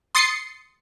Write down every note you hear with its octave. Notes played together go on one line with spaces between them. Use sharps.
C6 D#6 A6 C7 C#7